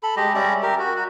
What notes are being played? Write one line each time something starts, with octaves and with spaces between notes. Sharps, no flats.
A4 B5
G#3 G4 D#5
G3 C#4 D5 E5
G4 A#4
F#4
F#4